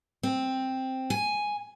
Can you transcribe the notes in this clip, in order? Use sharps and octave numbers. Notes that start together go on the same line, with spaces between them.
C4
G#5